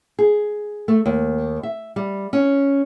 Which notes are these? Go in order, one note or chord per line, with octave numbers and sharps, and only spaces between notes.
G#4
A3
D#2
E5
G3
C#4